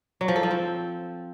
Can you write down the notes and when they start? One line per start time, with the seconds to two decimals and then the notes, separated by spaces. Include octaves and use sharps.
0.21 F#3
0.28 F3
0.36 A4
0.43 F3
0.51 C4